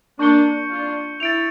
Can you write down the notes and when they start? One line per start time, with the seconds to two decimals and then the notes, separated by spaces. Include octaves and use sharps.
0.19 A#3 D4 C#6 G6 C#7 G7
0.70 D4 F4
1.20 E4 A6 D7 F7